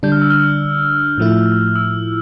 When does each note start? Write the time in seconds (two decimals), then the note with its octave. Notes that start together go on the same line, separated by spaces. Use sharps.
0.03 D3 G3 D4 G6
0.12 F6
0.22 E6
0.30 F6
1.18 A2 F3 A3 E4
1.76 E6